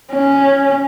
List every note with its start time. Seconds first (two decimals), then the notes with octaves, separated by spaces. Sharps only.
0.12 C#4